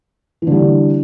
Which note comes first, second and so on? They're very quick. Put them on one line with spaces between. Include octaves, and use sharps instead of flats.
E3 D3 G3